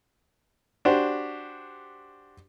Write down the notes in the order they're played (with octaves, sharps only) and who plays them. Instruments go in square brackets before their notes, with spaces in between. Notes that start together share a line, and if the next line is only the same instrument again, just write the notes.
[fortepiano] D4 F#4 G4 C5